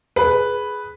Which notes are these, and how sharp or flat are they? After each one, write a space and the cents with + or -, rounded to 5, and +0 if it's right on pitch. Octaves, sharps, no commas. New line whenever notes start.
G#4 +10 B4 +0